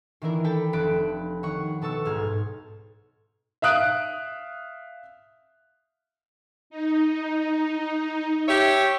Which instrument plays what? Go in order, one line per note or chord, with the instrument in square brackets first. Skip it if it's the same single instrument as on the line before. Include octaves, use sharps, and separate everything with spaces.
[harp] D#3 E3 D4 E4 A#4
A4 G5 A5 B5
F1 A5 B5 F#6 D7
D#3 C#5 F#5 C#6
B2 A4 A5 C#6 E6
B1 G#2 F6 G#6
[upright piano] E5 F5 D#6 F#6 D7
[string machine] D#4
[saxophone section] G4 C#5 E5